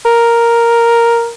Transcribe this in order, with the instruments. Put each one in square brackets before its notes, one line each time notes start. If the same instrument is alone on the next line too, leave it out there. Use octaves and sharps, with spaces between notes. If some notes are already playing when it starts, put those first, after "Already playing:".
[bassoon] A#4